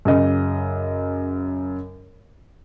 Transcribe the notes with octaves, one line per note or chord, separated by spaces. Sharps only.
F#2 C#3 D#5